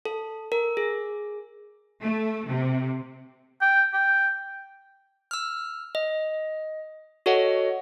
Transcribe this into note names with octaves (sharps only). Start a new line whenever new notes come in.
A4
A#4
G#4
A3
C3
G5
G5
E6 F6
D#5
F#4 A4 C#5 D#5 F#5